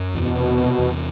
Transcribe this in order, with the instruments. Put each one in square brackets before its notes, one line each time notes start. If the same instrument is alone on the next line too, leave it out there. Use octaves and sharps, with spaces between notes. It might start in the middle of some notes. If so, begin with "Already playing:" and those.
Already playing: [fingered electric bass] F#2
[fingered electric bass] E2 [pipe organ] B2
[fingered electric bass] C3
C3
E2